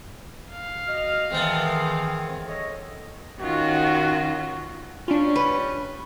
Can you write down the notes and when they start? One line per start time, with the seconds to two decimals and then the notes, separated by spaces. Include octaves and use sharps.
0.52 F5
0.87 F#4 D#5 F6
1.30 D#3 E3 G#3 A3 B3 C4
2.47 A4 C#5 D#5
3.40 D#3 C#4 F4 F#4
5.08 G3 C#4 D4 F4
5.36 B4